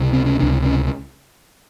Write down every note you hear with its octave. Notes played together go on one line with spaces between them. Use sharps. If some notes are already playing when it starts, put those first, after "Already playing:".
Already playing: C#2 C3
C4
C#4
C#2 C3 D4
C#4